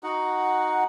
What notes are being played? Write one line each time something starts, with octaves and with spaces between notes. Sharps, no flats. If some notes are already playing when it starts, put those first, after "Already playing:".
D#4 F#4 F#5